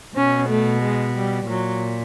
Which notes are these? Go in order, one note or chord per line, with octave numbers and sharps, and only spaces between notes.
B2 C#4
A3
G#3
G3
A#2 F#3